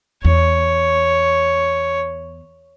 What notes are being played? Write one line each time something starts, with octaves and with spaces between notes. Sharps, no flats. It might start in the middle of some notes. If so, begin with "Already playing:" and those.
E2 C#5